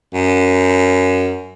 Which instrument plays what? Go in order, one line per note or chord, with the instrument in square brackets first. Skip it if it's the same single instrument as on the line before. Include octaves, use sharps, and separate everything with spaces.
[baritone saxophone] F#2